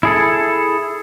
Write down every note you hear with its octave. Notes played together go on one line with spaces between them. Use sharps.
E4 G#4 A4